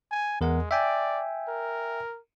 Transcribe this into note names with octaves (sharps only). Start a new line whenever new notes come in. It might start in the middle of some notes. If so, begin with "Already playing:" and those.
G#5
E2 G#3 A#4 F#5
D5 E5 G5 G#5
A#4